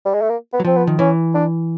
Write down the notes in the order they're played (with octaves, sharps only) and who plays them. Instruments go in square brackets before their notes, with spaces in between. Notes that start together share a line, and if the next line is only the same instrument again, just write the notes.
[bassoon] G3
G#3
A3
A#3
B3
[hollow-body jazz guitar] F#3
[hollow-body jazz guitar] F3 [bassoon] C4
[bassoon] B3
[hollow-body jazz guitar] D#3
[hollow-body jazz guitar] E3 [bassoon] C#4
[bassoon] D4